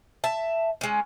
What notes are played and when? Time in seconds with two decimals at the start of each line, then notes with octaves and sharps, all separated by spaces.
0.24 E5 A5
0.81 G#3 C#4